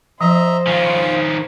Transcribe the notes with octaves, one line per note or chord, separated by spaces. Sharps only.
F3 C5 D#5 E5 A#5
D#3 C#4 F4